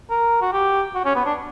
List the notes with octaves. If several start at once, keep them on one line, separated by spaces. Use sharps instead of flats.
A#4
F#4
G4
F#4
C#4
B3
D4